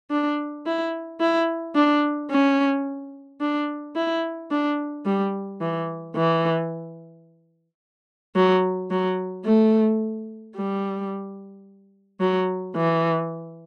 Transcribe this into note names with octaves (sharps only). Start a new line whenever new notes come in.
D4
E4
E4
D4
C#4
D4
E4
D4
G3
E3
E3
F#3
F#3
A3
G3
F#3
E3